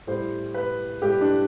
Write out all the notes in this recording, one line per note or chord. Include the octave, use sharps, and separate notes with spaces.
A2 G3 C5
B4
A2 G3 G4
D4